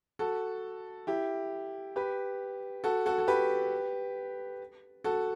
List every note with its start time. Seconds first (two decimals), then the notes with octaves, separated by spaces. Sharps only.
0.19 F#4 A4
1.07 E4 G4
1.96 G4 B4
2.84 F#4 A4
3.06 F#4 A4
3.18 A4
3.28 G4 B4
5.04 F#4 A4